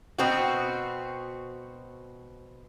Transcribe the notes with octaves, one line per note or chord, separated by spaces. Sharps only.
B2 C4 F#4